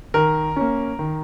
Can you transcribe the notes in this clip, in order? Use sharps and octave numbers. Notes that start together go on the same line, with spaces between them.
D#3 A#4
A#3 C#4
D#3